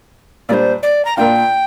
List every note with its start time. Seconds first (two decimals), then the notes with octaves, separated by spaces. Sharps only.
0.49 A#2 G3 D4 C5 D5
0.83 D5
1.05 A#5
1.17 A#2 A#3 D4 F4 G5